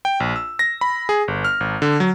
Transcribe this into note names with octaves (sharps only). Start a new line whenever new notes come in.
G5
A#1
E6
A#6
B5
G#4
G1
F6
G#1
D3
F#3